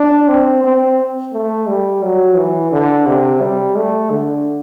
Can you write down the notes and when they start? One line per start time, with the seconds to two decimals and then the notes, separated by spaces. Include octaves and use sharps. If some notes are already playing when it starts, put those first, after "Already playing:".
Already playing: D4
0.28 C4
0.64 C4
1.33 A3
1.68 G3
2.03 F#3
2.36 E3
2.72 D3
3.06 C3
3.41 G3
3.76 A3
4.11 D3